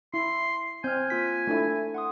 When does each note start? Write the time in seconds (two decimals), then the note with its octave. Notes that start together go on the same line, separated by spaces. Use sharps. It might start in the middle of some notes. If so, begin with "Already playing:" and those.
0.14 E4 C6
0.84 C4 G#5 F6 G6
1.10 A#3 F4 B6
1.47 A3 D4 E4
1.94 F#5 C6 D#6